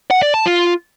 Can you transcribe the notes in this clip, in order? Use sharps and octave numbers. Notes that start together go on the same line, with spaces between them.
F#5
D5
A5
F4